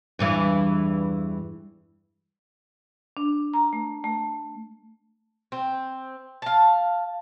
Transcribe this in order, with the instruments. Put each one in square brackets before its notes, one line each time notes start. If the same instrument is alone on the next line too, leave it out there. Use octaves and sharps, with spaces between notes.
[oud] E2 G2 E3
[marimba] D4
A#5
A3
A3
[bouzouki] C4
F5 A5